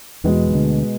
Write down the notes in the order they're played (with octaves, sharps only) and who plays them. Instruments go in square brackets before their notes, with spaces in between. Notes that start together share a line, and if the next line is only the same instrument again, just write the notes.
[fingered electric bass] E2 E3 [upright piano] B2 G#3 B3
[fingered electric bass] E3
D2 D3